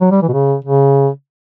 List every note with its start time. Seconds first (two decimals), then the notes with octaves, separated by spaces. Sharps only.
0.01 F#3
0.11 G3
0.22 E3
0.29 B2
0.33 C#3
0.65 C#3